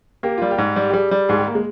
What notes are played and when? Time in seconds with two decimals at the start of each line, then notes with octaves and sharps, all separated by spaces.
0.23 A#3 G4
0.38 G3 F4
0.51 G4
0.58 G#2
0.76 G3
0.90 G4
0.93 G3 G#4
1.11 G3
1.29 G#2 G#4
1.37 G4
1.47 A#3
1.55 G#3